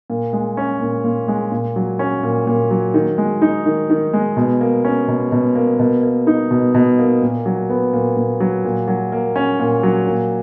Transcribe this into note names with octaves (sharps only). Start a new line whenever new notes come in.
A#2
G#3
C#4
A#2
A#2
G#3
A#2
F#3
C#4
A#2
A#2
F#3
D#3
G#3
D#4
D#3
D#3
G#3
B2
A#3
C#4
B2
B2
A#3
B2
A#3
D#4
B2
B2
A#3
A#2
F#3
B3
A#2
A#2
F#3
A#2
F#3
A#3
C#4
A#2
F#3
A#2